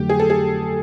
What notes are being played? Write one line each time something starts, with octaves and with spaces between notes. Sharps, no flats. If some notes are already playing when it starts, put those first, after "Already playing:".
Already playing: F2 D3 F#3 A3 G4
G#4
A4
G#4